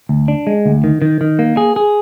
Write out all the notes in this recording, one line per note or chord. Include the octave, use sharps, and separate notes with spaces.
D2
D4
G#3
D2
D#3
D#3
D#3
A#3
G#4
G#4